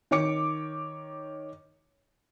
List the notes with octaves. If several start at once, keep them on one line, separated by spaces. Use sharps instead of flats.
D#3 C#5 D6 C#7